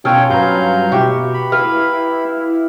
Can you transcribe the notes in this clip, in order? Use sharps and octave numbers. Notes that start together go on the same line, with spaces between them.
B2 C#4 F4 A4 C#5 F5 G5 G#5
G2 F#3 B4 F5 A#5 G6
B2 F#4 G4 E5 G5
B5
E4 B4 F5